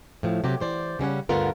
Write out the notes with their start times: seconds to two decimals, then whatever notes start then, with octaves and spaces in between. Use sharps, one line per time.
0.23 A2 F3
0.44 C3 F#3 G4
0.60 E3 C5 D5
0.99 C#3 G3 C#4 F#5
1.29 D2 G2 D3 B3 F4 A#4